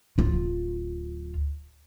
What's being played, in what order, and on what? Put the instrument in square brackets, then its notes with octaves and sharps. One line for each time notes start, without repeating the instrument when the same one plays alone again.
[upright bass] D1 F4